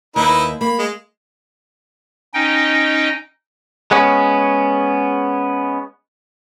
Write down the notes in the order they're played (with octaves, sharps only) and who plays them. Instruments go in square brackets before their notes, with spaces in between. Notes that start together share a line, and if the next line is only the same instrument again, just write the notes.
[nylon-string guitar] D#2 [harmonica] D#4 E4 B4
[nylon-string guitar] A#3 [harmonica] B5
[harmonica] G#3
[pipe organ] C#4 D#4 D#5 G5
[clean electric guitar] G#3 B3 C#4